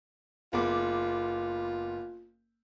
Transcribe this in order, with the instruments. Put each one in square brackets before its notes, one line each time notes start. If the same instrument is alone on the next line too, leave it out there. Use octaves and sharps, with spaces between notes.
[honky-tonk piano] F#1 B3 D6 [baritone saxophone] F4